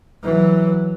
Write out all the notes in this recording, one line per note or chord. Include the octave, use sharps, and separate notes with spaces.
E3 F#3